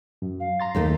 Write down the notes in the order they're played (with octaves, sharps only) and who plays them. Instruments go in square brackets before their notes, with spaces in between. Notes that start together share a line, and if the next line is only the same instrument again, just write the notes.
[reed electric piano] F#2
[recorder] F5
[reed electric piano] A#5 C6 A6
[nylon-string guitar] D#2 A3 D#4